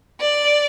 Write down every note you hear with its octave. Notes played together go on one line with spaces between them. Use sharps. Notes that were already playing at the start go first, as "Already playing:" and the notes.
D5